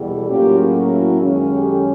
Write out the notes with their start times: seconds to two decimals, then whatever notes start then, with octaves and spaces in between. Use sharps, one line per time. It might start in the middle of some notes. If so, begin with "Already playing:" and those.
Already playing: E2 B2 G3 A4
0.27 A2 F#3 A#3 C#4 F4 G4
0.58 F#4 G#4
0.90 E4 F#4
1.20 F#2 D#3 G#3 C#4
1.51 G4 A4